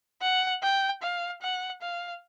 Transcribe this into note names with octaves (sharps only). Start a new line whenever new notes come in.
F#5
G5
F5
F#5
F5